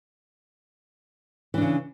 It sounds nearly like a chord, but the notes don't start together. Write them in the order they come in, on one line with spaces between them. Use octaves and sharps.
E3 D4 C#3